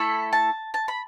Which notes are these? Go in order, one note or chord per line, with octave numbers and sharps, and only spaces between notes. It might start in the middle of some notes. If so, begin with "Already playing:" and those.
Already playing: A3 E4 A4 B5
A5
A5
B5